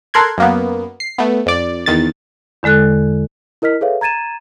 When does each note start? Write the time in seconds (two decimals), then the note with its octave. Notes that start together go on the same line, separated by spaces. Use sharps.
0.14 A4 A#4 C6 F#6 G#6
0.38 F#2 A#3 B3
1.00 C7
1.18 A3 B3
1.46 F2 D5
1.86 E2 D#3 A6
2.63 E2 D3 G#3 A4 F#6
3.62 E4 A#4 D#5 F6 B6
3.81 G#4 A4 B4 C#5 E5 F5
4.01 A#5 G#6 A6 D#7 E7